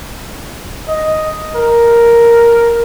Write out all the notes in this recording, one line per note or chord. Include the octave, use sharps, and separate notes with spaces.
D#5
A#4